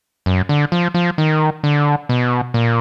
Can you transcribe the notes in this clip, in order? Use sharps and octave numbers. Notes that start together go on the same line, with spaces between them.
F#2
D3
F3
F3
D#3
D3
B2
A#2